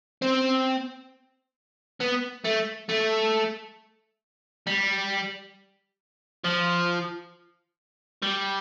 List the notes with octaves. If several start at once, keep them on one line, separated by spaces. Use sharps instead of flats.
C4
B3
A3
A3
G3
F3
G3